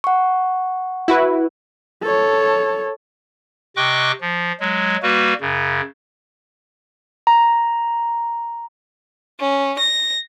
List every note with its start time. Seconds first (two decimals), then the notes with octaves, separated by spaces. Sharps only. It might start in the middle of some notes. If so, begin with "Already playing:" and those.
0.04 F#5 C#6
1.08 E4 F#4 B4
2.03 A4 C#5
3.76 C3 D#5 G5 C#6 D6 F#6
4.21 F3
4.60 F#3 G#3
5.03 G3 A#3 F#4 B4
5.41 F#2 C#3
7.27 A#5
9.40 C#4
9.79 A#6